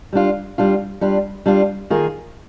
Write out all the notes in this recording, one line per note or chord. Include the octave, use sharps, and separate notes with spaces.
G3 D4 F4
G3 D4 F4
G3 D4 F4
G3 D4 F4
D#3 A#3 F4 G#4